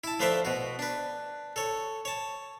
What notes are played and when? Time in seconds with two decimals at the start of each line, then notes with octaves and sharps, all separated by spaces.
0.04 E4 A5
0.20 F3 A3 B4 C5 D5 E5
0.45 B2 F#4
0.79 D4 B4
1.56 A4 C#5
2.05 C#5 A5